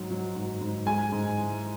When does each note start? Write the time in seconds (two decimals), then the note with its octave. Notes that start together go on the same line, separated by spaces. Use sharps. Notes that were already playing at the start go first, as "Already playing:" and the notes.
Already playing: G#2 F#3
0.11 F#3
0.35 G#2
0.61 G#2
0.86 G#3 G#5
1.12 G#2
1.37 E3